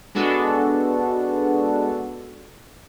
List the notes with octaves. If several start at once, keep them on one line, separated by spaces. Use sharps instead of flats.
G#3 B3 D4 F#4 A4